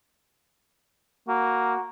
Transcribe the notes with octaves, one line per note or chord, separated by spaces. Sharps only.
A#3 F#4